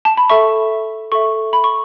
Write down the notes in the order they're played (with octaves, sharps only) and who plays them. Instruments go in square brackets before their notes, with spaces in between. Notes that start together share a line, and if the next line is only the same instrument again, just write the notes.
[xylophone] A5
B5
A4 E5 C#6
A4 E5 C#6
B5
C#6